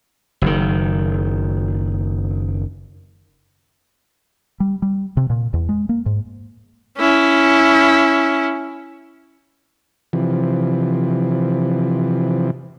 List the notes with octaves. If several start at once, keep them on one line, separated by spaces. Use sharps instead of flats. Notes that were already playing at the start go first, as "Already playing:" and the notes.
F#1 D#3
G3
G3
C3
A#2
E2
G#3
A#3
G#2
C#4 E4
C3 E3 F3